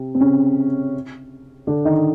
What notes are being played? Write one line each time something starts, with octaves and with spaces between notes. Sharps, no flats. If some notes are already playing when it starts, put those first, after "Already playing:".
Already playing: C3 C4
C4
C#3 C#4
D3 D4
D#3 D#4